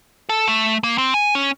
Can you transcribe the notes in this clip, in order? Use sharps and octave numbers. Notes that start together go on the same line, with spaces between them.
A4
A3
A#3
C4
G#5
C#4